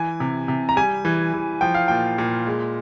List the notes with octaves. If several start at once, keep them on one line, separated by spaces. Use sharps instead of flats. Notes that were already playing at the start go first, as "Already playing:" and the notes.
Already playing: E3 G#5
C3
C3
A#5
G3 G#5
E3
E3
F3 G5
F5
A#2 G5
A#2
G#3